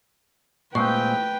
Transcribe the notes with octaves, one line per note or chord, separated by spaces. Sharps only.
A#2 G#3 A3 C4 B4 G5 C#6